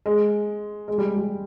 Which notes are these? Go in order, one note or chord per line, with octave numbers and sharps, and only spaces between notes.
G#3
G#3
G3
G3